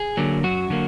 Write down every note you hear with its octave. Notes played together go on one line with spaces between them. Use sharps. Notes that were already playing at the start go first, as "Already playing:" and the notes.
Already playing: G#4
D3 F#3 A#3
F#2 F#3 F#4
D3 F#3 A#3